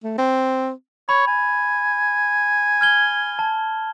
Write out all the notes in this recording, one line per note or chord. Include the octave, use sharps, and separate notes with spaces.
A3
C4
C#5 B5
G#5
F6 G#6 G7
A5